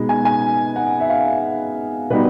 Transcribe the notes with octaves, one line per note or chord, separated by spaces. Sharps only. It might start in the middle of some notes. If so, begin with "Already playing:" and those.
Already playing: B2 G#3 B3 D#4
G#5
G#5
F#5
E5
F5
B2 G3 B3 D#4 B4